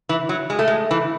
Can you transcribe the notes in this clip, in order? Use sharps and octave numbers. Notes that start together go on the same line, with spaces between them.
E3
F#3
G#3
A3
G#3
E3